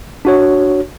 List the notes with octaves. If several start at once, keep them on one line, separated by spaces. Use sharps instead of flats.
D4 F#4 C#5